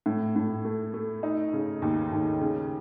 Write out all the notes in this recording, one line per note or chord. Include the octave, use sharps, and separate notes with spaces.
A2
A2
A3
A3
D#4
C#3
D#2
D#2
C#3